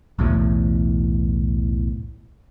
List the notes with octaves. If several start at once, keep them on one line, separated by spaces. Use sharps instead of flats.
B1 E2 A2 E3